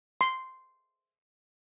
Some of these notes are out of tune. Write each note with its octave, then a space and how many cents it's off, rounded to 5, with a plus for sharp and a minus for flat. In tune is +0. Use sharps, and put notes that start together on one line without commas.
C6 -5